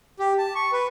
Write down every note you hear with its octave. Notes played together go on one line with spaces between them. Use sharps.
G4
A5
C#6
B4